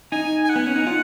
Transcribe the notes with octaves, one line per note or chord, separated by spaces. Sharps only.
D#4 G#5
G#5
F#5
B3
C#4
D#4
F4